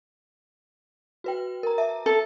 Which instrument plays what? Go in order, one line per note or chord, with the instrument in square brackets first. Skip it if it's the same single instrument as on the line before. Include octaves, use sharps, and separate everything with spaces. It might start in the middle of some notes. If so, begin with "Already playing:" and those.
[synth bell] F#4 B4 G5
A#4 A#5
E5 A5
[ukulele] A4